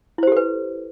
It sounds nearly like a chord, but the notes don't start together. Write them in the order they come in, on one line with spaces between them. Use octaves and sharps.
E4 C5 G4 A4 B4